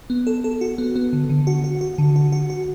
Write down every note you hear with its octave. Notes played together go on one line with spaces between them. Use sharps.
B3
A4
A4
F#4
B3
B3
D3
D3
F#4
F#4
F#4
D3
F#4
F#4
F#4